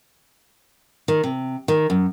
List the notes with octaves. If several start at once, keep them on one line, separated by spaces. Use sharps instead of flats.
D#3
C3
D#3
F#2